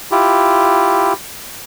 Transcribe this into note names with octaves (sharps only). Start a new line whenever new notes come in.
E4 F4 G4